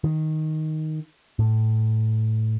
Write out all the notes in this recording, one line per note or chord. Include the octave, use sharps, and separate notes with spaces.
D#3
A2